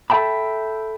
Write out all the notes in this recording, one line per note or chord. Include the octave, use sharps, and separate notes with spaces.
A4 E5 G5 A5 B5